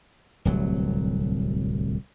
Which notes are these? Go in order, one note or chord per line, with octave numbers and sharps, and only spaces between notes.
D1 C2 F#3